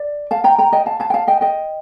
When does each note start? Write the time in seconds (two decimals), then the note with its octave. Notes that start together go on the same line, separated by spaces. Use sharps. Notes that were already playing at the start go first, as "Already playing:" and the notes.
Already playing: D5
0.31 F5 A5
0.44 G5 A#5
0.58 G5 A#5
0.73 D#5 G5
0.86 F5 A5
1.00 F5 A5
1.10 G5
1.14 F5 A5
1.27 D#5 G5
1.41 D#5 G5